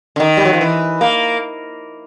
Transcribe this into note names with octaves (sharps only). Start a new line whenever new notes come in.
D3
D#3
G3
F#3
F3
E3
A#3